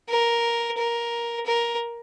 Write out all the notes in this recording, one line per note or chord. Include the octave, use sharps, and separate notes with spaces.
A#4
A#4
A#4